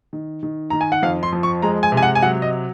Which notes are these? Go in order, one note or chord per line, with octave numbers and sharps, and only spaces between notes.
D#3
D#3
D#3 A#5
G#5
F#5
F2 F5
C6
F3
C#6
G#3 A#5
G#5
C3
G#5
F#5
G#5
F#3 F#5
D#5